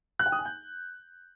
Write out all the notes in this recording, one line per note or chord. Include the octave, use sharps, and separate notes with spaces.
F#6
G5
D#6
G#5
G6